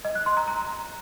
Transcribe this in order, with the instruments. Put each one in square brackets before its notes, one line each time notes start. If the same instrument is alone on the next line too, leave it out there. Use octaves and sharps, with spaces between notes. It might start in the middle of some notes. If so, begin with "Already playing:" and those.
[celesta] D#5
F#6
C6
A#5
A#5